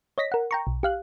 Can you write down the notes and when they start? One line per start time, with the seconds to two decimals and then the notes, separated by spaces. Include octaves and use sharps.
0.18 C#5 D#5 A#6 B6
0.32 A#4 F#5
0.51 G5 A#5 C#6
0.67 B1
0.83 G4 F5 F#6